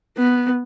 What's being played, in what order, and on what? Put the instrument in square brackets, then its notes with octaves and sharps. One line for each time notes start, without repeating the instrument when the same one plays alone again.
[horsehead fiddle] B3